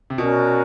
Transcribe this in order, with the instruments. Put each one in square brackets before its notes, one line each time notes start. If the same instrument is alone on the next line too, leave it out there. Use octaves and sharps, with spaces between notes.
[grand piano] C3
[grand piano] B2 [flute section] C#4 F#4 A#4 D5